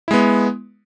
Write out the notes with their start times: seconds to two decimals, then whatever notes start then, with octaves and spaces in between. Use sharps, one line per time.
0.08 E4
0.11 G#3
0.14 B3